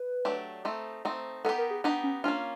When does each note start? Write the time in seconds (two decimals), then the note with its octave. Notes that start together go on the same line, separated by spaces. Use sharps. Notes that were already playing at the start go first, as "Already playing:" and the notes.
Already playing: B4
0.25 F#3 A3 D4 G4
0.65 A3 C4 D#4
1.05 A3 C4 D#4
1.45 B3 D#4 G4 A4
1.58 A#4
1.71 G#4
1.84 B3 D4 D#4 G4
2.04 C#4
2.24 A#3 C#4 D4 F4